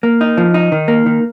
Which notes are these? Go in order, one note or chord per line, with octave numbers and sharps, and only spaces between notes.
A#3
D#4
F3
D#4
D#3
A#3
D#3